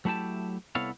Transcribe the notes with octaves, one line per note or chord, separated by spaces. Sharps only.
F#3 A3 E4 G4 A5
C2 B3 E4 A4 C#5 F5